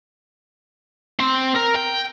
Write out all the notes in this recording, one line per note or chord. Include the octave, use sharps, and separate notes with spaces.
C4
A#4
G5